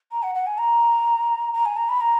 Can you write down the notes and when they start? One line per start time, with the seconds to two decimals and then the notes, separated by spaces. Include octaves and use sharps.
0.12 A#5
0.23 F#5
0.35 F#5
0.46 G#5
0.58 A#5
1.53 A#5
1.65 G#5
1.77 A#5
1.89 B5
2.01 A#5